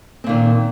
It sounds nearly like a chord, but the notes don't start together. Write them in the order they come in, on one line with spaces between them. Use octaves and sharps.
C4 A#2 D#3